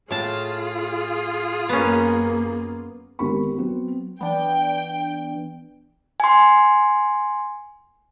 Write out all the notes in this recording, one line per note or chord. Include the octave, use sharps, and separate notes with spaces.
A2 F4 G#4 A5
F#2 A#3 B3 C#4
G#1 B3 G4 A#4 B5 C#6
F#3 B3 C4
E3 B3 D4 G5
G#5 C6